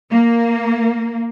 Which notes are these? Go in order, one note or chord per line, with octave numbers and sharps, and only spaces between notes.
A#3